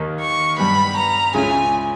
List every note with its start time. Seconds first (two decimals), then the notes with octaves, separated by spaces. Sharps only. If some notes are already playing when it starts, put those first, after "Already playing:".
Already playing: D#2 D#3 A#3 D#4
0.21 C#6
0.58 G2 G3 B3 B5
0.97 A#5
1.34 C#2 C#3 G#3 C#4 E4 G#5